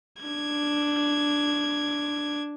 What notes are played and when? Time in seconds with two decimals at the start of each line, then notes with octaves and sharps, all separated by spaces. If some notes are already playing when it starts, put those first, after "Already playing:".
0.23 D4 G#6